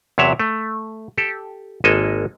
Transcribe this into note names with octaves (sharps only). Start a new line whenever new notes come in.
E2 C3 F#3 C#5 E5 F#5
A3
G4 A4
G#1 G#3 A#3 A4 D#5 G#5